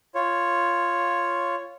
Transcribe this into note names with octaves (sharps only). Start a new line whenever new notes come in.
F4 C#5